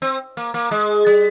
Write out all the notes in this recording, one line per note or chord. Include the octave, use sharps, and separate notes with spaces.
C4
A#3
A#3
G#3
G3